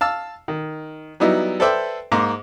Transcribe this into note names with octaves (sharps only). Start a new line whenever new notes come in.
F5 A5 E6
D#3
F#3 G3 B3 D#4 E4
A4 B4 C5 D5 E5 G5
G#2 A#3 A#5 C6 D6